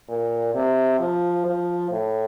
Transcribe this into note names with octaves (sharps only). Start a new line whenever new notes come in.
A#2
C3
F3
F3
A2